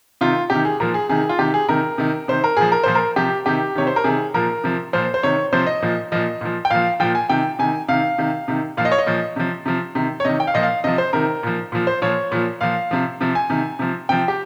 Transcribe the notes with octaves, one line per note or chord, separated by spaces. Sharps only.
C3 D#3 F4
C3 D#3 G4
G#4
A#2 F3 A#4
G#4
C3 D#3 G#4
F4
C3 D#3 G4
G#4
C3 D#3 A#4
C3 D#3
C3 D#3 C5
A#4
A#2 F3 G#4
A#4
A#2 F3 C5
A#4
C3 F3 G4
C3 D#3 G4
C3 D#3 C#5
C5
A#4
C3 D#3 G#4
A#2 F3 A#4
C3 F3
A#2 F3 C5
C5
C3 D#3 C#5
C3 F3 C5
D#5
A#2 F3
A#2 F3 D#5
A#2 F3
G5
A#2 F3 F5
A#2 F3 G5
G#5
C3 D#3 G5
C3 D#3 G#5
C3 D#3 F5
C3 D#3
C3 D#3
A#2 F3 F5
D#5
C#5
D#5
A#2 F3
C3 F3
C3 F3
C3 D#3
C#5
C3 D#3 D#5
G5
F5
A#2 F3 D#5
F5
C3 F3 D#5
C5
C3 D#3 A#4
A#2 F3
A#2 F3
C5
A#2 F3 C#5
A#2 F3
A#2 F3 F5
C3 F3
C3 F3
G#5
C3 D#3
C3 F3
C3 F3 G5
G4